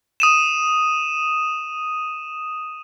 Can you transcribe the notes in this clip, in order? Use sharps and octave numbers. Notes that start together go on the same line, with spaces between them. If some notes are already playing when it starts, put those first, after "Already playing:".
D#6 D#7 E7